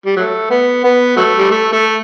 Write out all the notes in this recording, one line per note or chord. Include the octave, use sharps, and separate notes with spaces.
G3
F#3 A3
B3
B3
F#3 A3
G3
A3
A3